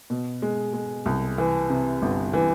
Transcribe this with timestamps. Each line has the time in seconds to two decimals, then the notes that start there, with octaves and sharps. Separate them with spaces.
0.10 B2
0.42 G#3
0.73 G#3
1.06 C2
1.38 E3
1.70 C3
2.02 G1
2.33 E3